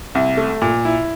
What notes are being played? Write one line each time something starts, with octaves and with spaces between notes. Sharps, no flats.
C2
A3
A#2
E4